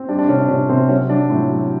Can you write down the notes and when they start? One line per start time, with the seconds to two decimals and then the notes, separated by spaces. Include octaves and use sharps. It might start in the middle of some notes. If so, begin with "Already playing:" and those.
Already playing: C4
0.08 G3 D4
0.19 D4
0.29 C3 C#4
0.39 D4
0.49 C3 C#4
0.69 C3 C4
0.89 F#3 C#4
1.10 F#3 D4
1.30 A2
1.50 F#3